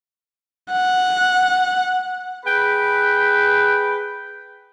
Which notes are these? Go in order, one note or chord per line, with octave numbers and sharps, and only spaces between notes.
F#5
G#4 B4 G5 B5